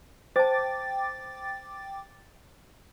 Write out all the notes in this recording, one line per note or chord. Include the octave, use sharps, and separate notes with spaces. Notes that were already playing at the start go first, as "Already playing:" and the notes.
C5 G5 A5 D6 A6